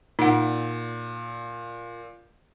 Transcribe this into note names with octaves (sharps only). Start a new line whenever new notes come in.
A#2 D#4 F#5